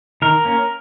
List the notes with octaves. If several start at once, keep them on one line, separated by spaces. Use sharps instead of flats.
D#3 A#4
A#3 C#4